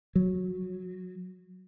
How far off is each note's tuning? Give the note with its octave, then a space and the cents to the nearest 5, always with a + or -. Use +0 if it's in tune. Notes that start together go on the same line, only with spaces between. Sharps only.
F#3 -15